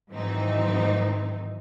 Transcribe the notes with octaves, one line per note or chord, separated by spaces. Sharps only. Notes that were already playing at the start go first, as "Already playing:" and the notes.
G#2 D#3 E3 F#3 C4 D#4